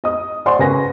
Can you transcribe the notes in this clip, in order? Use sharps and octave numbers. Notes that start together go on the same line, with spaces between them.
D#5 D#6
C5 D5 F#5 G#5 C6 C#6
C#3 A#4 B4 G#5 A#6